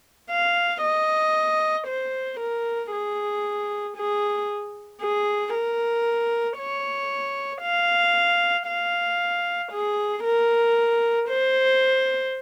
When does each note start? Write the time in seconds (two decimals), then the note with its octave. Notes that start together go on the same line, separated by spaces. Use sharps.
0.30 F5
0.82 D#5
1.87 C5
2.40 A#4
2.92 G#4
3.97 G#4
5.01 G#4
5.54 A#4
6.58 C#5
7.62 F5
8.67 F5
9.72 G#4
10.24 A#4
11.29 C5